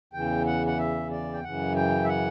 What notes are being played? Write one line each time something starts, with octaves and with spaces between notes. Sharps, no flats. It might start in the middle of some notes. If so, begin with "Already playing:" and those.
E2 C#3 E3 G5
F#5
F#5
E5
D5
G5
F#2 C#3 E3 F#5
G5
E5
F#5